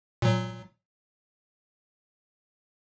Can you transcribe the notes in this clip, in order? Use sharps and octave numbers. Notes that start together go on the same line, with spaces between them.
A#2 F#3